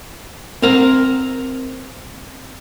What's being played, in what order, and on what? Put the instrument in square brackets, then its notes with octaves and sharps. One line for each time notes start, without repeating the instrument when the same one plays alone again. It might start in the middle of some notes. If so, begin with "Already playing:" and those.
[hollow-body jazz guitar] C4 A#4 A#5